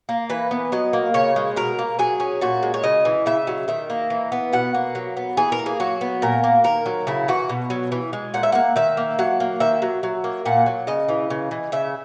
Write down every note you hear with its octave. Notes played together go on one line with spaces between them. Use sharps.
A#3
E3 B4
B3
F#3 D#5
A#3
C#3 C#5
G#3
B2 A#4
A#3
F#3 G#4
C#4
A#2 F#4
G#3
C#5
C#3 D#5
E3
C#3 E5
F#3
D#3 E5
A#3
E3
B3
B2 F#5
A#3
F#3
B3
E3 G#4
A#4
A#3
G#4
F#3 F#4
B3
A#2 A#4
A#3
D#3 A#4
F#3
C#3 E4
E3 F#4
B2
F#3
E3
G#3
A#2 F#5
E5
A#3 F#5
D#3 E5
A#3
F#3 F#5
A#3
D#3 E5
F#3
F#3
A#3
A#2 F#5
F#3
C#3 D#5
E3
C#3
E3
C#3 E5